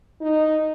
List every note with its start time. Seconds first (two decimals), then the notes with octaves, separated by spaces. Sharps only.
0.21 D#4